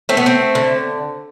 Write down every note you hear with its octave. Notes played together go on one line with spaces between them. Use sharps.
A3 C4
B3
C4
D3